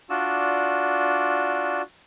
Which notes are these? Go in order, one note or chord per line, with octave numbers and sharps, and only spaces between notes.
D4 F4 F#4 D5 E6